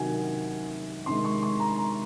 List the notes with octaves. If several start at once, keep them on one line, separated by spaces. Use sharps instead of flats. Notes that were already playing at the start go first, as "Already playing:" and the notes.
Already playing: C3 D#3 F#3 F#5 G#5
C3 D#3 G#3 C6
C#6
C6
A#5
A#5